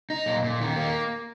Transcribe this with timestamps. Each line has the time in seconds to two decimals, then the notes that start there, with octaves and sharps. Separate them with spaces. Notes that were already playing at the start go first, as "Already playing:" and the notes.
0.10 D#4
0.26 A#2
0.44 A#2
0.60 D#3
0.76 A#3